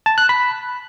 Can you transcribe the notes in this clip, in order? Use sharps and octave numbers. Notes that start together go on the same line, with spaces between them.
A5
F#6
B5